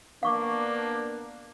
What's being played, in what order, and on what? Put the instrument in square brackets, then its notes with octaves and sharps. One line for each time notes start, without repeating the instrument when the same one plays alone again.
[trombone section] A#3 B3 D4 [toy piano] F5 C#6 D6